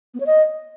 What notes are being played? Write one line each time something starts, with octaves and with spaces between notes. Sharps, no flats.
B3
C#5
D#5